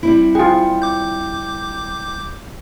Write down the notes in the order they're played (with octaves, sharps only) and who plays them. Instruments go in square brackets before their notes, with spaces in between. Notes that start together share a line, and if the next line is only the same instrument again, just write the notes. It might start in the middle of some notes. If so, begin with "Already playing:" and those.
[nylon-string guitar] G3 C4 E4
[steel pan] F4 G#4 [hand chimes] G5
[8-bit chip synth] D6 G6